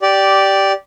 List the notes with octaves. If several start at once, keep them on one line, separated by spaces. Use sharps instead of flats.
G4 D5